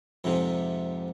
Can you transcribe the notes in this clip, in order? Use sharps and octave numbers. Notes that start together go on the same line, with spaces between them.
F2 G#2 C3